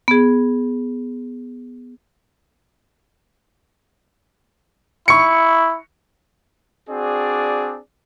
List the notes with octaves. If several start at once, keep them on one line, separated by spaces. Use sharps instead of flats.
B3 G#4
E4 C#6 C#7
C4 D4 F#4 G#4 D5